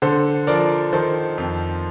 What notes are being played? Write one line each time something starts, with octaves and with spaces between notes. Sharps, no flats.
D3 A4 C5
F3 A#4 D5
D#3 A4 C5
F2